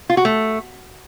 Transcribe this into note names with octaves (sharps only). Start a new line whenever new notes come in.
F4
F#4
A3